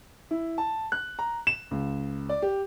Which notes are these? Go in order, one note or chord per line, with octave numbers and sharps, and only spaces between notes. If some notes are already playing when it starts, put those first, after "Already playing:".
E4
A5
F#6
A#5
E7
C#2
D5
G4